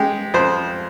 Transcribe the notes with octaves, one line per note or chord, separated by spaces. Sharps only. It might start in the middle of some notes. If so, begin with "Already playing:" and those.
Already playing: G#3 G4
F2 C5